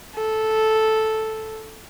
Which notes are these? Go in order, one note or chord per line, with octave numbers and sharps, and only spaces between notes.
A4